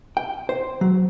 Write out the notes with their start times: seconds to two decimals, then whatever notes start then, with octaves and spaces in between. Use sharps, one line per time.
0.17 G5
0.49 C5
0.81 F#3